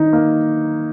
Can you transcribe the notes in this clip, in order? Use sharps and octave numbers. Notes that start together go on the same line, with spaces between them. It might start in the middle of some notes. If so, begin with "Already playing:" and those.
Already playing: D#3 D#4
A#3